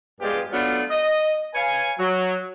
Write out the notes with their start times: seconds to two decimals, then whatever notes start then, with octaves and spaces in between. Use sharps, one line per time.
0.21 G2 F3 G#3 B3 F4 G4
0.53 F#3 A3 B3 D4 F4
0.91 D#5
1.54 B4 C#5 F5 G#5
1.98 F#3